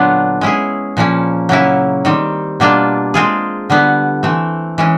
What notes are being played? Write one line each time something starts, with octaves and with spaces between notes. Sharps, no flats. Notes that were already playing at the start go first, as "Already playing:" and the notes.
Already playing: A#2 D3 F#3 B3 D4 F4
G#3 C#4 E4 G#4
A#2 F3 A#3 C#4
C#3 F#3 A#3 C#4 E4
D#3 G3 C4
B2 G3 A#3 D4 F4
G#3 C4 F4 G#4
D3 G3 B3
E3 A3 C4
E3 G#3 C#4